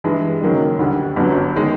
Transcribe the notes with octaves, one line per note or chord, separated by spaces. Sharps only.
G2 E3 G#3
F#1 F#2 D#3 F#3 A#3
D2 D3 G3
G1 F#2 D3 F#3
D#3 G#3